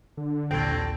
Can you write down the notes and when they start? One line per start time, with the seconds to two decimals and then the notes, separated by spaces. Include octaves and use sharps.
0.17 D3
0.51 A#1 D#2 A2 G3 C4 A4